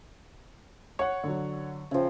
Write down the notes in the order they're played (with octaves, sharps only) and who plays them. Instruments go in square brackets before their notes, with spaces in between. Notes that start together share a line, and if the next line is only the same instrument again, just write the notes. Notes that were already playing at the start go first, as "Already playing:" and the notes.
[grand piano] C#5 F#5 [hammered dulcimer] C#6
[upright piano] D3 F#3
[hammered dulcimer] C#3 F3 [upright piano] E5 G5